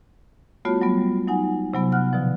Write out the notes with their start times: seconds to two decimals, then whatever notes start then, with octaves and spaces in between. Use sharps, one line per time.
0.65 G3 A3 B3 F4 F#4 C#5
0.81 F#3 G3 B3
1.28 F#3 D#4 F#5 G#5
1.74 C3 F#3 B3
1.92 F#5 F6 F#6
2.13 B2 D3 F3